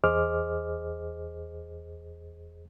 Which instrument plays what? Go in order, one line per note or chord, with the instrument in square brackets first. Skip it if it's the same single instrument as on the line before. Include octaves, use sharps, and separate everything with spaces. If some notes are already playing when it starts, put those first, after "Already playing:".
[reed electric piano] E2 G#4 C5 D#5 D6 F6